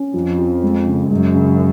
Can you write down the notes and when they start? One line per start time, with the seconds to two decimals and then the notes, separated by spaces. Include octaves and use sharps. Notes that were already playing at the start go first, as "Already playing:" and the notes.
Already playing: C#4
0.14 F2 F3
0.39 F4
0.63 G#3
0.87 C#3
1.11 F#2 G#3
1.35 C#3